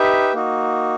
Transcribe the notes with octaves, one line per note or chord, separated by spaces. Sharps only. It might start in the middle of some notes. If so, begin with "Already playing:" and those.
Already playing: D#4 G4 B4 E5
A#3 D#4 F#4